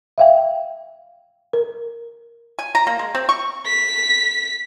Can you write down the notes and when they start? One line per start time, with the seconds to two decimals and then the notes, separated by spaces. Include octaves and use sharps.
0.18 E5 F5 G5
1.53 A#4
2.59 G#5
2.75 A#5
2.87 A#3
2.99 G#3
3.15 C4
3.29 C#6
3.67 B6